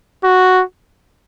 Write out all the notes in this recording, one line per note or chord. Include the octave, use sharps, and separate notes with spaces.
F#4